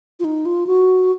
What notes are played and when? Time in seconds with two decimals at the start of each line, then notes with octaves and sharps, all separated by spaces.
0.20 F4
0.24 D#4
0.45 F4
0.67 F#4